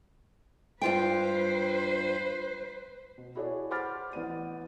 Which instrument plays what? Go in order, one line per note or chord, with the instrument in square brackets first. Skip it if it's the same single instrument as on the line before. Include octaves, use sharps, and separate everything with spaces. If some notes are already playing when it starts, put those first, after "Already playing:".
[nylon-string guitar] G2 F4 G5 [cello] B4 C5
[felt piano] B2
E4 F#4 G#4 A4 C#5 D5
C5 F#5 B5 D6 F6 A6
A1 B3 D5 D#7